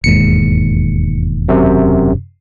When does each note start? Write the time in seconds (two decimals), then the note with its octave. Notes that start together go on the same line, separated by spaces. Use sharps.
0.04 E1 D#2 G#2 C#7
1.49 F#2 C3